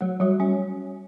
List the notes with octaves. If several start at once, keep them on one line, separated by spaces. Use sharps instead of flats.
F#3 A3
F#3 G3
G3 C#4